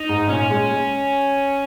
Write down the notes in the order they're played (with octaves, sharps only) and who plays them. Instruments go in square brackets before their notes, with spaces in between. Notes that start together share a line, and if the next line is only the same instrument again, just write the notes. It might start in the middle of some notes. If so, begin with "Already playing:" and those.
Already playing: [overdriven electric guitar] D#4
[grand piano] G#2
[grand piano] A#2 [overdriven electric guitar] C#4
[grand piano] G#3
G#3